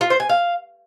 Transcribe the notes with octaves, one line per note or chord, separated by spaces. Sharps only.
F4
C5
G#5
F5